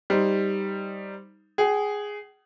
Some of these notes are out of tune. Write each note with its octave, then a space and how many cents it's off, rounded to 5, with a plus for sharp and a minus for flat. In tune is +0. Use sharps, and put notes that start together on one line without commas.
G3 +0 D#4 +10 C5 +0
G#4 +0 G5 -45